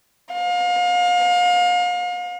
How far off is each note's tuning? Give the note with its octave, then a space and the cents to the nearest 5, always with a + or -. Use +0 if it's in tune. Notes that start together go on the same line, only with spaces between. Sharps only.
F5 +35